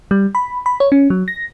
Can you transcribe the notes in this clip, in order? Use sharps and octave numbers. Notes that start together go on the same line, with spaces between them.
G3
B5
B5
C#5
C#4
F#3
A#6